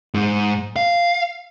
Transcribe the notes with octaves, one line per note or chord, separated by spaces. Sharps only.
G#2
F5